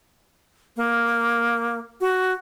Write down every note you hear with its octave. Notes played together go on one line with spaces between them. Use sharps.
A#3
F#4